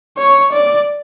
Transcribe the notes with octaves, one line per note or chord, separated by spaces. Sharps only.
C#5
D5